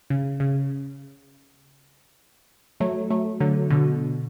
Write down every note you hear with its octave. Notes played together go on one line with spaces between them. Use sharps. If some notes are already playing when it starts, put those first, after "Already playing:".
C#3
C#3
F#3 A3
F#3 A3
D3 F#3
B2 D3